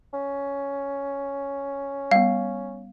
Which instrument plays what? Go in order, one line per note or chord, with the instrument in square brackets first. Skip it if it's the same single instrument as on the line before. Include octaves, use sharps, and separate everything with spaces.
[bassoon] C#4
[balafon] G3 B3 [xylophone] F5